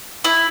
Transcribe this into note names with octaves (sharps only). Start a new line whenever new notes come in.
E4